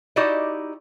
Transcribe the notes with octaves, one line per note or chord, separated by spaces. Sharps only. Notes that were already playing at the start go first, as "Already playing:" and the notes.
D#4 E4 F#4 G4 D5 D#5